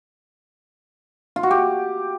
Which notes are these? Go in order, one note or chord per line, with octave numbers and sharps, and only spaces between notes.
F4
F#4
G4